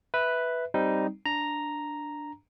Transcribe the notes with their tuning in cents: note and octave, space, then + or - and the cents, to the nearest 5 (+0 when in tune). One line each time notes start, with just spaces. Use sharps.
B4 +0 E5 -10
G3 +0 C4 +0 D#4 +0
D4 +0 A#5 +0